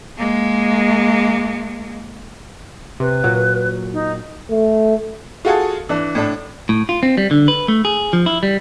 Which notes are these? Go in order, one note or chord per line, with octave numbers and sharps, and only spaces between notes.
G#3 A#3
C3 B4
A#2 F#3
D#4
A3
F4 F#4 G#4 A4
E3 D4
A2 D4
A2
F4
C4
G3
D3
B4
A3
G#4
F3
E4
G3